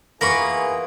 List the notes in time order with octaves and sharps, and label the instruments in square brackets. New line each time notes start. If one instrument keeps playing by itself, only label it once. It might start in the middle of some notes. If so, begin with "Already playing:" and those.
[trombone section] E3 G#4 [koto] A#3 B3 F4 [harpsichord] A#5 B5 C#6